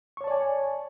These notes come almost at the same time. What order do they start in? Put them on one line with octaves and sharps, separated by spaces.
C#6 C#5 A5 D5 G#5